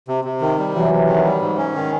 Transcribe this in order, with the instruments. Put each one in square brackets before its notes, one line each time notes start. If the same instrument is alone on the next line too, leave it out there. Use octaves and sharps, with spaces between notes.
[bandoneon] C3
C3
D#3
G3
[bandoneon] C3 [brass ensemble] E3 F#3
[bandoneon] C3
D#3
G3
G#2
C#4
D#3